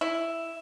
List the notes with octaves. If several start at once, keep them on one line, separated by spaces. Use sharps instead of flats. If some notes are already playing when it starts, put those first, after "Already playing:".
E4